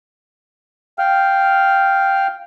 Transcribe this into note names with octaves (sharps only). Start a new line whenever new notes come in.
F5 G5 F6